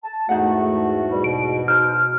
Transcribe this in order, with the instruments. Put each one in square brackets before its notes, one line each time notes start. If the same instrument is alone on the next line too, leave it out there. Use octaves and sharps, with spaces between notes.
[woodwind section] A5
[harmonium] E2 G#2 F#4 [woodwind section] A3 [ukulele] D#4 F5 F#5
[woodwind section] B2 G3
[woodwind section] B2 [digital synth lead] D7
[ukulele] D#4 C5 [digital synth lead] F6